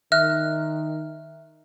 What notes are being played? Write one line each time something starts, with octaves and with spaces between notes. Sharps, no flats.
D#3 E5 F6 F#6